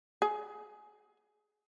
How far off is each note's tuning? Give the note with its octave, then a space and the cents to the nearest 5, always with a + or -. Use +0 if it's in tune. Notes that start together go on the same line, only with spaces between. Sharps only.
G#4 +20